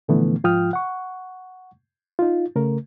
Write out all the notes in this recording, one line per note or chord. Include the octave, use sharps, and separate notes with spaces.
A#2 D3 E3 F3 A3 B3
G#2 F3 F4 G5 D#6 F6
F#5 C#6
D#4 F4
C#3 A3 A#4